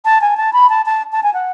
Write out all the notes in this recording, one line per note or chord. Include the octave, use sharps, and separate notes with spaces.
A5
G#5
A5
B5
A5
A5
A5
G#5
F#5